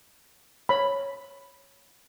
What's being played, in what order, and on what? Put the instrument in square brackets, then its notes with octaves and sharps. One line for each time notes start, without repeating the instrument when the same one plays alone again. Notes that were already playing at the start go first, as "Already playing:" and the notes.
[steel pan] C#5 B5